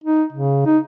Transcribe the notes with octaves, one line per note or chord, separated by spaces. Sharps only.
D#4
C#3
D#4